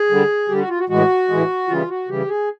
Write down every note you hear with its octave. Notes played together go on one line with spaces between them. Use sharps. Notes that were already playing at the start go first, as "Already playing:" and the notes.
Already playing: G#4
D3 G3
D3 G3 G4
F#4
F4
F#4
A2 E3 G#3 F#4
A2 E3 G#3
C#3 E3 G3 F4
F#4
C#3 E3 G3 G4
G#4